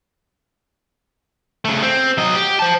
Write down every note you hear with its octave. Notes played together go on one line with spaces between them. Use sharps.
C#3 A3
C4
F#3 D#5
G4
C5 A5